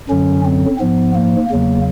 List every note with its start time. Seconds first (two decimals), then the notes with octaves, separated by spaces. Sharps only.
0.09 F#2 D3 F#3 C#4
0.45 C4
0.80 G#2 F3 B3
1.15 A#3
1.49 E2 C#3 F#3 A#3